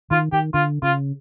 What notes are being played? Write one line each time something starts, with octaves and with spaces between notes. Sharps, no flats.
D#3 F4
D#3 G4
D3 F4
C#3 F4